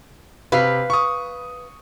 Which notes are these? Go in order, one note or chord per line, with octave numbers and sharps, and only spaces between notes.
C3 B4 F5
C#6 D#6